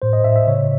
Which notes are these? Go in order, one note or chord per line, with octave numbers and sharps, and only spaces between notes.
A2 C5
D#5
A2 E5
E5
C#3 C#5